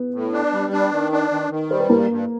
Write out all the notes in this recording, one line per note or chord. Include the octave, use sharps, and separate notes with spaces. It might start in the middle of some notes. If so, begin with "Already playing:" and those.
Already playing: B3
A2
D4
G3
D4
D#3
D4
D#3
D#3
G3 C5
B4
G2 A#3 A#4
G2